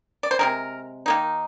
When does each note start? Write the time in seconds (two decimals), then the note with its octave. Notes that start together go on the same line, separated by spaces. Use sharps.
0.23 D5
0.31 C5
0.39 C3 F3 G#3 A#4
1.06 D#3 A#3 D#4